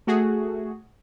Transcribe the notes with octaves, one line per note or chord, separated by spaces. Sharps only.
A3 F#4 G#4